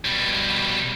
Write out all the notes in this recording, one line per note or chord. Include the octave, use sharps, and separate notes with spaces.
B2 G3